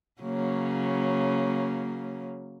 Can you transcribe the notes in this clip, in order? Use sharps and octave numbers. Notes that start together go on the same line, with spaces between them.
C#3 F#3 A#3